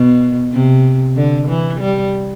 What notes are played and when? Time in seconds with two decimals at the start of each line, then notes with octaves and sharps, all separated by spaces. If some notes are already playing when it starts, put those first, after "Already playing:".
Already playing: B2
0.53 C3
1.16 D3
1.48 E3
1.80 G3